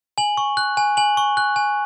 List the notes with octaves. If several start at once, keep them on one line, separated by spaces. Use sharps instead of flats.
G#5 F#7
C#6
F#6
G#5
G#5 F#7
C#6
F#6
G#5